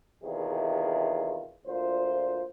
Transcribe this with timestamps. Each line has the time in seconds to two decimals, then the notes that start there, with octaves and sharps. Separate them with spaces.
0.24 E2 C3 D#3 E4 F4 G#4
1.66 D2 A#2 F4 C5